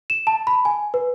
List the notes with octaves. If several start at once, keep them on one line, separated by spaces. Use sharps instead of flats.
E7
A5
B5
G#5
B4